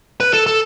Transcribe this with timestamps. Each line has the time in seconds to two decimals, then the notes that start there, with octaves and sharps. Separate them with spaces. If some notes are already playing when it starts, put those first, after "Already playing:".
0.20 B4
0.33 A4
0.47 A4